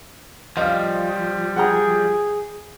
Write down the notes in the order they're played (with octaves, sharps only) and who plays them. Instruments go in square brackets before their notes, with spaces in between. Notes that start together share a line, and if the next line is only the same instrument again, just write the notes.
[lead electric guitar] F3 G3 [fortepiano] D#5 F5
[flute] G#4 [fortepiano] F#5 G5 A#5